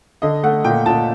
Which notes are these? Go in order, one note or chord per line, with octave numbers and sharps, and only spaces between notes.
D3 D#5
A3 F#5
A#2 G5
A#2 A5